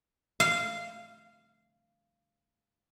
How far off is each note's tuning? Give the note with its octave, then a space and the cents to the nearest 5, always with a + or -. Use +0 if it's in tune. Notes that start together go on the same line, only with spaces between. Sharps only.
F5 -15